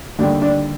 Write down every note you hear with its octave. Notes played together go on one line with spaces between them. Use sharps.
D#2 D3 G3 D4
D4